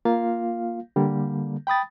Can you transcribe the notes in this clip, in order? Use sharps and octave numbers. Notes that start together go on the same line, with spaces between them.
A#3 F4 F5
D3 G3 A#3
G5 B5 D#6 A6